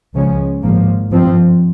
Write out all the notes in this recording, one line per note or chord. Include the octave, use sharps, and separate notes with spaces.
C#2 C#3 F3 G#3 C#4
G#1 G#2 F3 A#3
G2 F3 C4